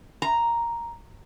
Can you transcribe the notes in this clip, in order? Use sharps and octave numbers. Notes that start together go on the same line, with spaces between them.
A#5